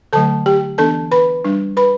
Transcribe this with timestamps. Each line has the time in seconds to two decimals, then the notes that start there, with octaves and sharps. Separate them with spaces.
0.13 D3 F#3 A3 A4 A5
0.46 G4 G5
0.78 E3 B3 D4 A4 A5
1.11 B4 B5
1.45 G3 D4
1.77 B4 B5